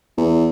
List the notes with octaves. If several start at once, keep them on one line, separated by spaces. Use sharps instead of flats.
E2